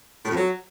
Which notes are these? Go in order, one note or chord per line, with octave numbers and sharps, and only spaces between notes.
A2
F2
F#3